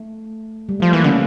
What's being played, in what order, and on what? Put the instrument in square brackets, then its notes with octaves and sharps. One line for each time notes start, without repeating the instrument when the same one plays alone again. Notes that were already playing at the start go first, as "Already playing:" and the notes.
Already playing: [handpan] A3
G3
[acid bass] F3 [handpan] A3
[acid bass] E3 [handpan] A#3
[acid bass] D3 [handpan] C#4